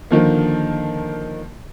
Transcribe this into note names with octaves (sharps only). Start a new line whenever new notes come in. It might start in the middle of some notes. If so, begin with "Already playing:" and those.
D3 D#3 F3 A#3